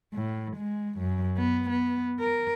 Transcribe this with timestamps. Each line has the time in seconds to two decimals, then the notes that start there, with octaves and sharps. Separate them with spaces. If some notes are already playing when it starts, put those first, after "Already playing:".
0.14 A2
0.56 G#3
0.98 F#2
1.37 B3
1.70 B3
2.20 A#4